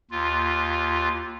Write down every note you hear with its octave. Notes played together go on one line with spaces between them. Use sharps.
D#2 F4